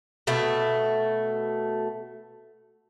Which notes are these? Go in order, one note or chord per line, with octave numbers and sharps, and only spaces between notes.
B2 A3